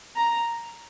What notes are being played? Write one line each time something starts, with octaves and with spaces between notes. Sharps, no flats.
A#5